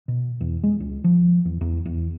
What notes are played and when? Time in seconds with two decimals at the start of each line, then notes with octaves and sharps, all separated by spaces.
0.08 B2
0.41 E2
0.63 G#3
0.80 C#2
1.04 F3
1.45 E2
1.61 E2
1.86 E2